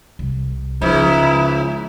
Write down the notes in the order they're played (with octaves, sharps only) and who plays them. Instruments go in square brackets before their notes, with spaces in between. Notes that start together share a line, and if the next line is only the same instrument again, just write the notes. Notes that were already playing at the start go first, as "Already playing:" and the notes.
[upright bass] C2
[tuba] C#2 [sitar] G#2 [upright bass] F3 [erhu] E4